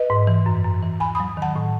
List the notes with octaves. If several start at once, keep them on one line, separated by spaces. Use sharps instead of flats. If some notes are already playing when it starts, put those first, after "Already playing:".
Already playing: B4 D#5
G#2
E3
F#2
F#2
E3
E2 G#5 B5
F#3 B5 D#6
D#3 F#5 A5
A2